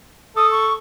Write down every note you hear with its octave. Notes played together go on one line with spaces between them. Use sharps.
A4 D#6
C#6